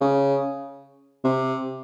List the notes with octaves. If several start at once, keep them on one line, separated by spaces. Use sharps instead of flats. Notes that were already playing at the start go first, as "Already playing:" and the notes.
C#3
C3